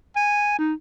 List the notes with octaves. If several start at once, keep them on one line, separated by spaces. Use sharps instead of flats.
G#5
D#4